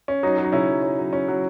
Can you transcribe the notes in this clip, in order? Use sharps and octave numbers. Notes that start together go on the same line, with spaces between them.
C#4
F#3 D#4
F#3
D#4
C#3 C#4 E4
F#3
C#4
F#3
C#4
F#3